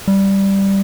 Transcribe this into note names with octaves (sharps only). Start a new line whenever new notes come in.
G3